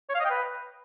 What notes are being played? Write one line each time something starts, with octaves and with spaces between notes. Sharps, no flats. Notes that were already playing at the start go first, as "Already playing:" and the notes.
C#5
F5
D#5
G5
B4